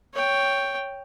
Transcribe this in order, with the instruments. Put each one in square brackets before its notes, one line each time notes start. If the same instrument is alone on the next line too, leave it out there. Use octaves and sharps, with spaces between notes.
[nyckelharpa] C#5 G5